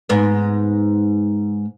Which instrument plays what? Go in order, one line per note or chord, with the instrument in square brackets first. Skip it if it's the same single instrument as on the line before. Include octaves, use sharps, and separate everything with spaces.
[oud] G#2 B3